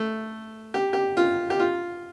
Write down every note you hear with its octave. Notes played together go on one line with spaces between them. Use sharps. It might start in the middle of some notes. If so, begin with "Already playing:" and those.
Already playing: A3
G4
G4
F4
G4
F4